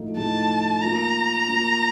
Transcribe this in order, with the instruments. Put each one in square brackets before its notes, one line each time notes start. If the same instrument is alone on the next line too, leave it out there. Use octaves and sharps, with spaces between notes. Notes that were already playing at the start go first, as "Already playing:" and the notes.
Already playing: [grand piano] A2 F3 A3 D#4
[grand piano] A2 F3 A3 D#4 [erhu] A5
[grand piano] A#3 F4 A#4 [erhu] A#5
[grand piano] A#3 F4 A#4